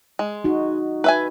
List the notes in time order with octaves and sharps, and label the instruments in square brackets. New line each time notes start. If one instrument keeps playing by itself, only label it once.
[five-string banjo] G#3
[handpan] D#4 F#4
[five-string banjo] B4 E5 G#5